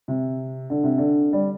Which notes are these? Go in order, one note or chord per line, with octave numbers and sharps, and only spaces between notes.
C3
D3
C3
D3
G3